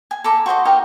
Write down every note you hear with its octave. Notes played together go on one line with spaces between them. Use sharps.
G#5
A4 B4 A#5 D6
F#4 C5 D#5 D6
D#4 G4 A#4 D#5